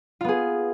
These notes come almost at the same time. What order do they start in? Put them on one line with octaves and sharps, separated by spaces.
F4 B3 G#4